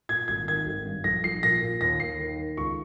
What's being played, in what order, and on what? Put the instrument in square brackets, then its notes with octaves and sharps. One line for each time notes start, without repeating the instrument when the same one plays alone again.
[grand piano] A#2 G#6
G#1 G#6
D#3 G#6
G#1
G2
A#1 A#6
A#1 C7
A#2 A#6
A#2
D#2 A#6
D#2 C7
D#3
D#3
C#2 C#6